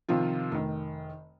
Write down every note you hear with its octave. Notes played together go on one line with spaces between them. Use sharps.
C3 D#3 F3 F4
F1 D#3